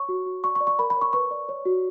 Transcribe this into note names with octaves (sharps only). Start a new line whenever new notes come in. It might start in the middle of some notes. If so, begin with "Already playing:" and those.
Already playing: C#5 C#6
F#4
F#4
D5 C#6
C#6
D5
C#6
A#4 B5
B5
C#5
C#6
B4 C#6
D5
C#5
F#4